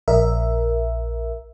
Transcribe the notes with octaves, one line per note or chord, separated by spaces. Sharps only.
A#1 A#4 E5